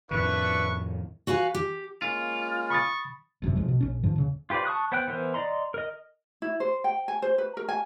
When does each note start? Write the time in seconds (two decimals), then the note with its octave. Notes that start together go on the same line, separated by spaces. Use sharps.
0.11 F2 A2 D#3 D4 B4 E5 C#6
1.27 F#4 B4 F5 G#5
1.55 G4
2.02 G#3 A#3 C#4 F4
2.70 B5 C#6 D#6 A6
3.42 G1 F#2 A2 C3
3.56 B1 F3 G#3
3.68 B2
3.81 A#1 C#4
4.03 G2 D#3 F3
4.15 D#1 C#3
4.50 F4 G4 B4 C5 D5
4.65 A5 C#6 D#6 F#6
4.92 B3 C5 F#5 G5 F#6
5.08 E3 B3 A#4 C5
5.34 D5 D#5 A#5 C6
5.74 A#4 D#5
6.42 E4
6.60 C5
6.84 G5
7.08 G#5
7.22 C5
7.38 B4
7.57 A#4
7.69 G#5